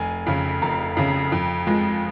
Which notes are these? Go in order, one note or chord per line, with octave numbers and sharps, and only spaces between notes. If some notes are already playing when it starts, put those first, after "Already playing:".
Already playing: F1 G#5
F2 C#3
F1 A#5
F2 C#3
F2
F3 G#3